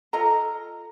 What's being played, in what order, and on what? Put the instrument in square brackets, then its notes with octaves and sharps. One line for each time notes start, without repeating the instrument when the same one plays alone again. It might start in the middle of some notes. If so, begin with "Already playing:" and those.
[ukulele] F4 A4 D#5 A#5